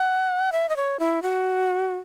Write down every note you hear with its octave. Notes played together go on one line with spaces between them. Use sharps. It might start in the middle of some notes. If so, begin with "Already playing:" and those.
Already playing: F#5
E5
D#5
C#5
E4
F#4